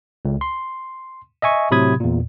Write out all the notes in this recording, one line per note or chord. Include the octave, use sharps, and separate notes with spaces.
C#2
C6
D#5 E5 G#5 C#6
A2 C3 F#3 B5 D#6 G#6
E2 A#2